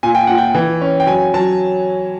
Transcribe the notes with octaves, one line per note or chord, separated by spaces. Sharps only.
A#2 G#5
G5
A#2 F#5
G5
E3
C#4
G5
F#3 G#5
F#3 A5